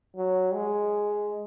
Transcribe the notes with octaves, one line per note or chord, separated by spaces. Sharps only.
F#3
G#3